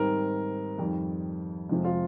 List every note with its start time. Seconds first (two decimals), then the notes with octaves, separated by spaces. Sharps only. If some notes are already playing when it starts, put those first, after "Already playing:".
Already playing: G#2 D#3 G3 C4 A#4
0.78 F2 D#3 G3
1.69 F2 C3 F3 G#3 C4
1.84 F4